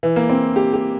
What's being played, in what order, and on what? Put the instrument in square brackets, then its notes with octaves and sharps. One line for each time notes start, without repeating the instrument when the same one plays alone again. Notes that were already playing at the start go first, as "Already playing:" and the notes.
[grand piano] E3
A#3
C4
G4
G4